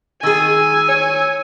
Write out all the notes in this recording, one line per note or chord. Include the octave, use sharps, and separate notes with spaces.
D#3 G#4 G#5 E6
C#5